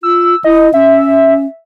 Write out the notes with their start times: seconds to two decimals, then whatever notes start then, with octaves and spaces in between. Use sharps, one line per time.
0.03 F4 E6
0.44 E4 D#5
0.74 C#4 E5